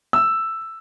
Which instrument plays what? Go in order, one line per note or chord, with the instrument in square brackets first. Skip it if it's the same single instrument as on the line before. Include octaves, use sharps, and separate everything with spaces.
[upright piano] E6